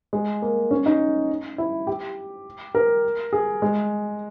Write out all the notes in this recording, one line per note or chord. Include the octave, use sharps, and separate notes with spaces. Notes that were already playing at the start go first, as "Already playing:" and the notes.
G#3
A#3
C#4
D#4
E4
G4
A#4
G#4
G#3